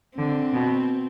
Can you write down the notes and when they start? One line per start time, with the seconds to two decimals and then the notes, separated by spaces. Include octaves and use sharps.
0.18 D3 C4
0.53 B2